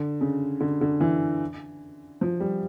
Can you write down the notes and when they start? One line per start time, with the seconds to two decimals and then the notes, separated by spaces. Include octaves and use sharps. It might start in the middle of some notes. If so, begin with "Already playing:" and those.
Already playing: D3
0.21 C#3
0.60 D3
0.81 D3
1.00 E3
2.21 F3
2.40 G3